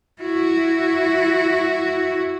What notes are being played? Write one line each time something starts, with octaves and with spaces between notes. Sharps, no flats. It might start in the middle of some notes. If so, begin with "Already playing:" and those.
E4 F#4